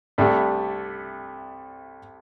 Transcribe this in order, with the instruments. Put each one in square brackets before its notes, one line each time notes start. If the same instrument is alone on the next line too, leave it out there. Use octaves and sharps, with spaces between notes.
[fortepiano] C2 C3 A3 D4